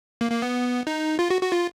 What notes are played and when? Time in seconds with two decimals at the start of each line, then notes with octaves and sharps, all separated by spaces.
0.21 A#3
0.32 A#3
0.42 B3
0.87 D#4
1.19 F4
1.30 F#4
1.42 F#4
1.52 F4